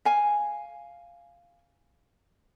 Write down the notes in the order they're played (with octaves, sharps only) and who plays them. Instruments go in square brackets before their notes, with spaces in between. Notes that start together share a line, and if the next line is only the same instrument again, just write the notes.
[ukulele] F5 G#5